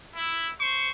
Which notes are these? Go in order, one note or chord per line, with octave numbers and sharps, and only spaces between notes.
E4
C5 C#6